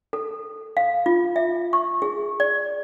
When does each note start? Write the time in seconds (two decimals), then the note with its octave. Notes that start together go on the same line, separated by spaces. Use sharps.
0.13 A4
0.77 F5
1.06 F4
1.36 E5
1.73 C#6
2.02 G#4
2.40 D5